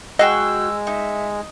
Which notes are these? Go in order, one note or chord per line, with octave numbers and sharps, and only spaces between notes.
G#3 F#4 G#4 D#5 G5 E6
D#4 E5